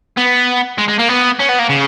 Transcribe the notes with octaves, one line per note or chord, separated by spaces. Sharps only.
B3
G#3
G#3
A#3
B3
C#4
B3
A#3
C#3